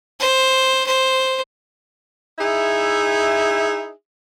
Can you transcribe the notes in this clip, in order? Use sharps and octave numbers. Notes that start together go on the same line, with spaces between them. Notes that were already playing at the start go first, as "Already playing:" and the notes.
C5
C5
D#4 E4 G#4 E5